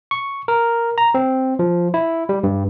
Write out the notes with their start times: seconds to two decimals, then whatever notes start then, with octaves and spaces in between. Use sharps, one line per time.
0.11 C#6
0.48 A#4
0.98 A#5
1.14 C4
1.59 F3
1.94 E4
2.29 G3
2.43 G2